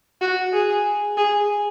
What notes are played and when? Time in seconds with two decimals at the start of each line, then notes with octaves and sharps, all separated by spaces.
0.21 F#4
0.53 G#4
1.17 G#4